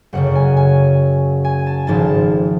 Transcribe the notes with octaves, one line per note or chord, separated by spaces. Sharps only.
F#1 F#2 C#3 F#5
G#5
G#5
G#5
A5
G#1 G#2 F3 A5